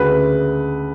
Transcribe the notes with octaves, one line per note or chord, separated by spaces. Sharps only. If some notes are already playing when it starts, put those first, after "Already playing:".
Already playing: D2 C#3 G#3 B4